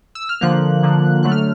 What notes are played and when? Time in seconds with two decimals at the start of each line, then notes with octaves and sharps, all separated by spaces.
0.15 E6
0.29 F6
0.41 D3 F3 A#3 F#6
0.83 D3 F3 A#3
1.23 D3 F#3 A3 F#6
1.32 F6